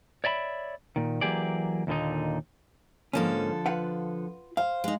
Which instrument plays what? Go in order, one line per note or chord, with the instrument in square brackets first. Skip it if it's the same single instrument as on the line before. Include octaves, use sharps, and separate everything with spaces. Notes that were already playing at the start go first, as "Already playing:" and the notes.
[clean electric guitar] C#5 D5 E5 A#5 B5
A#2 D#3
E3 F#3 A#3 G4 G#4 D5
D#2 A#2 D3 D#4
[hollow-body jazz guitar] G#2 A#3 C#4 [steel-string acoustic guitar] D3 F3 A4
[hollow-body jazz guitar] F4 B4 F#5
[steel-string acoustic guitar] C5 [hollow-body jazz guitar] F5
[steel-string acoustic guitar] G#3 D#4